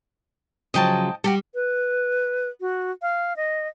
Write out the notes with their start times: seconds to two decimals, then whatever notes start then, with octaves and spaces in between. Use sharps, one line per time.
0.74 C#3 F3 F#3 D#5 G5 A5
1.24 G3 F#4 G4 A4
1.54 B4
2.60 F#4
3.02 F5
3.36 D#5